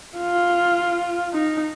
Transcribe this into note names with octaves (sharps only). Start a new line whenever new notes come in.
F4
D#4